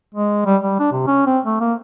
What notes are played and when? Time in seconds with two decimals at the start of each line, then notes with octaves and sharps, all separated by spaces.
0.15 G#3
0.46 G3
0.63 G3
0.80 D4
0.92 C3
1.07 C#4
1.26 C4
1.46 A3
1.61 A#3